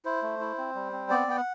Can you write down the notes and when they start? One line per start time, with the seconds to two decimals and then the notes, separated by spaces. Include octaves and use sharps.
0.05 E4 C5
0.22 A3
0.41 E4
0.58 C4
0.75 G3
0.92 C4
1.10 B3 D5
1.28 B3 G5
1.37 F#5